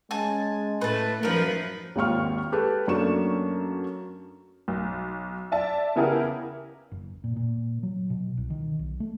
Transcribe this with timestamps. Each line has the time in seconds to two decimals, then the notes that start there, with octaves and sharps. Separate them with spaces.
0.11 G#3 C#4 G#5 A5
0.81 A2 A3 B4 A5
1.23 F#2 F3 D#4 A#4 B4
1.96 G#1 D#2 F4 C#6 F6
2.52 G4 A4 B4
2.87 F#2 A3 A#3 D4 C#6 E7
4.68 B1
5.52 D5 E5 A5
5.96 C#3 B3 E4 G4 G#4 A#4
6.92 F#1
7.24 A#2
7.36 A#2
7.83 F#3
8.10 B2
8.38 C2
8.50 D#3
8.79 B1
9.00 A3